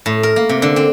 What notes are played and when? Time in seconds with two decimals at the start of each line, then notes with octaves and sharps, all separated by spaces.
0.06 A2
0.23 A#4
0.36 A#3
0.49 C3
0.62 D3
0.76 C4